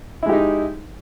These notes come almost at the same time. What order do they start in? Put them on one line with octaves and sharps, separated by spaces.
E4 G#3 G4 D#4